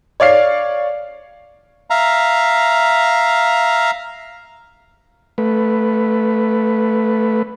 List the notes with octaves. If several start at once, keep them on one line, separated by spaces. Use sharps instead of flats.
C#5 D5 F5 C7
E5 F5 A#5
A3 B4